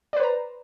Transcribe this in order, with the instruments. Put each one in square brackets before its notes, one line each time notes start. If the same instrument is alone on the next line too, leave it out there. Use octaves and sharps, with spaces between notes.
[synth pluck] D5
B4
C5
A#5